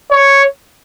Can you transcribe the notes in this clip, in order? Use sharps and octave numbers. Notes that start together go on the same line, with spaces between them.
C#5